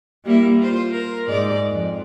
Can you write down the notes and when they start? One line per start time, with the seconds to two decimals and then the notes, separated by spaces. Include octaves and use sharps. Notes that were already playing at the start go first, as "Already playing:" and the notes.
0.25 G3 A#3 E4
0.59 F4 C5
0.92 A#4
1.28 G#2 D5
1.71 F2